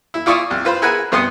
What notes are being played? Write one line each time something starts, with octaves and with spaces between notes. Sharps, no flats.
E4
E4 F4 D5 C#6 D#6 E6
C2
F4 B4 C5
E4 G#4 A#4 B4 F#5 G#5
G2 C3 B3 C6 D#6